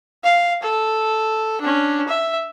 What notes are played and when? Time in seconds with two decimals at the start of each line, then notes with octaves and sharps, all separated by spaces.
0.24 F5
0.62 A4
1.61 C#4 D4
2.08 E5